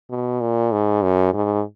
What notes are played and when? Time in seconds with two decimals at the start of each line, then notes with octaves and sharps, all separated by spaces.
0.10 B2
0.41 A#2
0.72 G#2
1.02 F#2
1.34 G#2